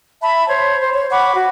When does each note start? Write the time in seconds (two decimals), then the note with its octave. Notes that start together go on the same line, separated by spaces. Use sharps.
0.22 E5 A5 B5
0.48 C5 C#5
0.80 C5
0.93 C#5
1.10 F#5 B5 C#6 D6
1.35 F#4